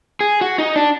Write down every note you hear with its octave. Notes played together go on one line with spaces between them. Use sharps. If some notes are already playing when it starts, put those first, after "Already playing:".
G#4
F#4
D#4
D4